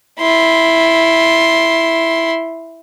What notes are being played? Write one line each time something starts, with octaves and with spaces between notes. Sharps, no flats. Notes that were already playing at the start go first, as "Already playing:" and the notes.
E4 C6